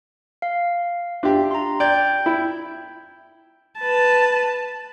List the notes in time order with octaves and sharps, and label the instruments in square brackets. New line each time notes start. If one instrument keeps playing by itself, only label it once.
[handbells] F5
[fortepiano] D4 G4 [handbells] F4 E5
[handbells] A#5 C6
[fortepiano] D5 [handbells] G5 G6 G#6
[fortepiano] E4
[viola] B4 A5